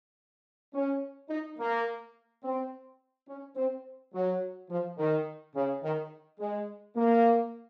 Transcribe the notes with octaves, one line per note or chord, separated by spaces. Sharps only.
C#4
D#4
A#3
C4
C#4
C4
F#3
F3
D#3
C#3
D#3
G#3
A#3